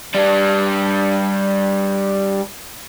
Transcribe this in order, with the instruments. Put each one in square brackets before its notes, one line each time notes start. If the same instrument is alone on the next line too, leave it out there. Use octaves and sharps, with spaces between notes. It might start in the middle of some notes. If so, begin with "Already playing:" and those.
[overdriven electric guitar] G3 D4